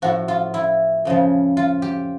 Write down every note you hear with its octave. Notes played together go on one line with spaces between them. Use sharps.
A2 F3 F#4
F4
E4
F2 C#3 F3
F4
G4